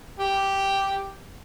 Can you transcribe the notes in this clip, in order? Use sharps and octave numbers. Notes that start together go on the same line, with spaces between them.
G4